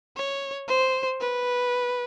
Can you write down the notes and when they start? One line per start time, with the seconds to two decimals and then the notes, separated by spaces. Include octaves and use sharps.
0.17 C#5
0.68 C5
1.21 B4